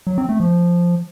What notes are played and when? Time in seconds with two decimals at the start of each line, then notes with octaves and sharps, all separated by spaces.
0.07 F#3
0.18 C4
0.29 A3
0.40 F3